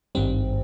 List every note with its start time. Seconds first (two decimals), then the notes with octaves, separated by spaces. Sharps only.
0.15 G#1 G2 D#3 G3 C4